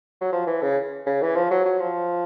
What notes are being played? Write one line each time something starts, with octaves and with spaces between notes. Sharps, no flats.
F#3
F3
E3
C#3
C#3
E3
F3
F#3
F#3
F3